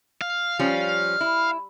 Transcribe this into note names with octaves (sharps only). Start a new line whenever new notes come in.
F5
F3 G3 C#4
E4